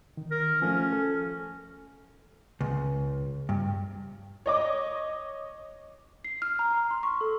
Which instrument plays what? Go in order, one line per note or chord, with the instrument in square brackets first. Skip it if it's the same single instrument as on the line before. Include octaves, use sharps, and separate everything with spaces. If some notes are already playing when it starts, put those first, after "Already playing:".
[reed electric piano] D#3
[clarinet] A#4
[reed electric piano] F3 A3 [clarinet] C#4
[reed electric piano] A4
[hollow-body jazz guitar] C#2
G2
[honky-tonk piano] C#5 D#5 D6
[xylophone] C7
F6
A#5
A#5
C6
C#6
A4